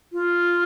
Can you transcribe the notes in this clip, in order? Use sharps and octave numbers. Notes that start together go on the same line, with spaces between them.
F4